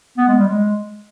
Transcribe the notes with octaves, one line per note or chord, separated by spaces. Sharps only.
B3
G#3
G3
G#3